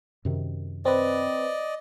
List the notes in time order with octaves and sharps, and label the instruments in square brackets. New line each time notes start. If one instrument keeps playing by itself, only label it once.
[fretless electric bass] F#2 C3 D#3
[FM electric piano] C4 B4 [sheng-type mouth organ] D5 D#5